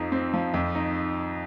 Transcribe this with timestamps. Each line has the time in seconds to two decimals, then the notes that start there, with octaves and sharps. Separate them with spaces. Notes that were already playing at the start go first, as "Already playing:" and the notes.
Already playing: F2 F3 D#4
0.12 C4
0.34 F3
0.54 F2
0.75 D#4